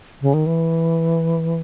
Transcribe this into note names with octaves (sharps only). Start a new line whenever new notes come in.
C#3
D#3
E3